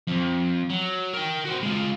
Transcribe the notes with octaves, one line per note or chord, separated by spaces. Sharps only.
F2
F#3
A#4 G5
C4 F#4
G#3 F4